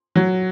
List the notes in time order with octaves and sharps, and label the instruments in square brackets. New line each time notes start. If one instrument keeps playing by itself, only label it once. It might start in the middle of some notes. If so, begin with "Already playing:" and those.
[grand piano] F#3